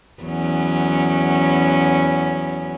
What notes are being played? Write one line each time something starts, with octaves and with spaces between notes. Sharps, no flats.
E2 F#3 C#4